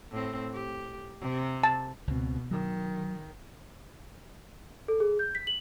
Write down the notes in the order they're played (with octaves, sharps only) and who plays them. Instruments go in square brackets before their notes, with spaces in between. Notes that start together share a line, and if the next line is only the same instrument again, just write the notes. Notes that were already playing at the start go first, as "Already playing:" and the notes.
[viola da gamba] A2 C4
G4
C3
[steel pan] A5
[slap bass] C#2 C4 [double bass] B2
[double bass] D#3 [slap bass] F#3
[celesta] A4
G#4
G6
B6
F#7